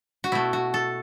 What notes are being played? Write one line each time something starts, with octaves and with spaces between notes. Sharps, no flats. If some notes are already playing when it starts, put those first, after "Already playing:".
F#4
B2 A3 E4
F#4
A4